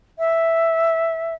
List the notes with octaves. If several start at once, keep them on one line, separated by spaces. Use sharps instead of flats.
E5